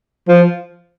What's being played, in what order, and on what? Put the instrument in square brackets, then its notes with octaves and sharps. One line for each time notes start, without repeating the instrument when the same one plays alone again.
[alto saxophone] F3